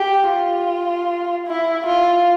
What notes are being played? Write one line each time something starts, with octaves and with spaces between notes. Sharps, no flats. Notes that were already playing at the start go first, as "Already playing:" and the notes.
Already playing: G4
F4
E4
F4